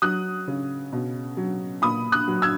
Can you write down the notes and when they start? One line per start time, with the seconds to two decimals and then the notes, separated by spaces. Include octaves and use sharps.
0.02 F#3 D#6 F#6
0.47 C#3
0.92 B2
1.37 F#3
1.82 A#2 B5 D#6
2.12 D#6 F#6
2.28 F#3
2.42 E6 G#6